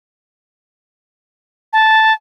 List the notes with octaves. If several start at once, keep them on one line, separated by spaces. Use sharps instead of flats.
A5